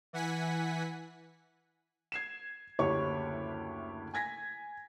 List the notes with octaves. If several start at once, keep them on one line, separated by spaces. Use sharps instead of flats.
E3 F#5 G#5 B6
G#6 C7 E7
F#1 D2 E4 G4 C#5 C#6
G#5 G#6 A#6 B6